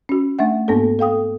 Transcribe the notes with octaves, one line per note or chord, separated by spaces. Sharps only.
C#4 F#4
A3 D4 E5 F#5
G#2 A#3 B3 D4 A4
A4 F5 G5 D#6